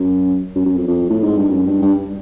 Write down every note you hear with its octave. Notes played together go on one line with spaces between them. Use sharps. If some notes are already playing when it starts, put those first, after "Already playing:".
Already playing: F#2
F#2
F#2
F2
F2
A2
G#2
G2
F#2
G2
G2